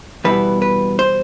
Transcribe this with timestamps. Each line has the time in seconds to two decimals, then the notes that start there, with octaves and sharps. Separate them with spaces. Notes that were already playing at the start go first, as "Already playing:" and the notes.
0.24 E2 B2 G3 B3 E4 B4
0.62 B4
0.99 C5